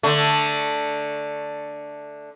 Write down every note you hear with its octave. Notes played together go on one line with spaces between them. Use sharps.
D3 A3